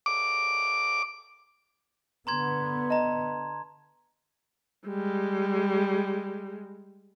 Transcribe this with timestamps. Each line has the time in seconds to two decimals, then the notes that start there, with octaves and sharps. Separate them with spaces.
0.06 D6
2.27 D3 B3 A#5 C6 G#6
2.90 D#5 A5 A#5
4.87 G3 G#3